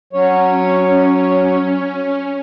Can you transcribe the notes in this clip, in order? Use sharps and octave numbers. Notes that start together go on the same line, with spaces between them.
F#3 C#4 C#5